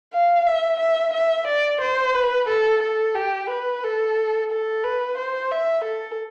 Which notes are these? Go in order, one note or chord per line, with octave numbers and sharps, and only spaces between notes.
F5
E5
E5
E5
D5
C5
B4
A4
A4
G4
B4
A4
A4
B4
C5
E5
A4